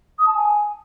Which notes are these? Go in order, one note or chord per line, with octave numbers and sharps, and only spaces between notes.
D#6
A5
G#5